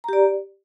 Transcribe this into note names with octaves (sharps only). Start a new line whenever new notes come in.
G4 D5 A#5